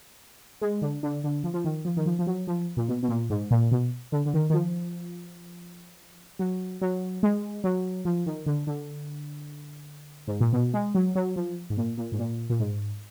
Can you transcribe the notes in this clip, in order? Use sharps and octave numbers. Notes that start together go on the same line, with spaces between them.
G#3
D3
D3
D3
F3
F3
D#3
F3
D#3
F3
F3
F#3
F3
A#2
B2
B2
A#2
G#2
A#2
B2
D3
D3
D#3
D#3
F3
F#3
F#3
G#3
F#3
F3
D#3
D3
D3
G#2
A#2
B2
G#3
F#3
F#3
F3
G#2
A#2
A#2
G#2
A#2
A#2
G#2